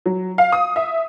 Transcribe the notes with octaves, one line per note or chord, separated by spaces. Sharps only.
F#3
F5
D#6
E5